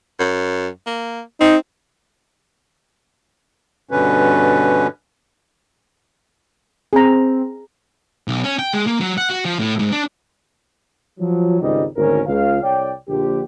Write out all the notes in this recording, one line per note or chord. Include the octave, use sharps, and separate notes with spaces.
F#2
A#3
C4 D#4
G2 B2 D3 C#4 B4
C4 G#4 A#5
B1
C#4
G5
G#3
A#3
F#3
F#5
F#4
F3
A2
G#2
D4
F3 F#3
G#1 C#2 G#2 G3 D#4 D#5
G#1 D2 D#3 C#4 A#4
C#2 F5
C2 C#5 D5 G5
A#1 D3 G4